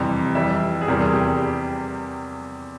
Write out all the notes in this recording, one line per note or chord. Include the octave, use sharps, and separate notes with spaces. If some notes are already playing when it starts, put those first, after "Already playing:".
Already playing: F2 C3 E3 G3
F2 E3 G3 E5
G#4
E2 C3 E3 G3 A#4
G#4
G4